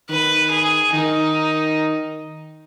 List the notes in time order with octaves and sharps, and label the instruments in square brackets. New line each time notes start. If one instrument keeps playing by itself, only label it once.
[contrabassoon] D#3 [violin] B4
[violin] G#4
[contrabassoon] D#3 [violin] D#4